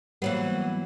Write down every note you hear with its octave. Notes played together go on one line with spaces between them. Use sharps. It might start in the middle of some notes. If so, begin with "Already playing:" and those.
E3 F#3 G3 A#3 B3